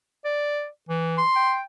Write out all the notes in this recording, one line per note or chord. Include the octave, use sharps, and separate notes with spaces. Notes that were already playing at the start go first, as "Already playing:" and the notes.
D5
E3
C6
G5